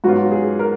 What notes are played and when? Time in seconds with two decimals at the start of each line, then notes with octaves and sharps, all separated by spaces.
0.04 G#2 F#3 B3 F4 F#4
0.32 G#4
0.59 A#4